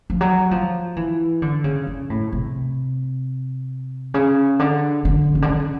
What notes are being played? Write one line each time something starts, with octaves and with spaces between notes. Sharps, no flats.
F3
F#3
F3
E3
D3
C#3
C#3
A2
C3
C#3
D3
D3
C#3
D3
C#3